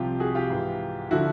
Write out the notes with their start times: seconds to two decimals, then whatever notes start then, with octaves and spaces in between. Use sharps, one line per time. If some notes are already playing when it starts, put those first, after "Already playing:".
Already playing: C2 C3 F3 F4 G4
0.20 F#4 G#4
0.35 F4 G4
0.50 G#2 E3
1.11 D3 F3 E4 F#4